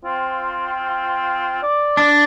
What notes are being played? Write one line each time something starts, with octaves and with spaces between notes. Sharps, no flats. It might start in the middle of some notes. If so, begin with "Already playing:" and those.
C4 F4
D5
D4